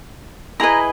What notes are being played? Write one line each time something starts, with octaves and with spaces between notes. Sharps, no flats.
E4 G#4 B4 D#5 A#5